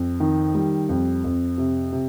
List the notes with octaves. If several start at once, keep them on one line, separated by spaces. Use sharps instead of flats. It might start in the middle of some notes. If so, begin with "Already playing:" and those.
Already playing: F2
D#3
G3
F2
F2
C3
C3